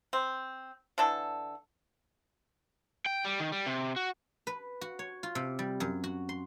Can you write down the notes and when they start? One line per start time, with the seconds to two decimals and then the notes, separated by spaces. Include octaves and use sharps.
0.13 C4
0.98 D3 E3 D4 A4
3.06 G5
3.24 G3
3.40 D#3
3.52 G3
3.66 C3
3.96 F#4
4.47 B4
4.81 F#4
4.99 C#5
5.23 F4
5.35 C3
5.59 G3
5.80 F#2
6.04 F#4
6.29 C6